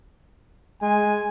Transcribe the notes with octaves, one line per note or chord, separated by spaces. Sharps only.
G#3 G#5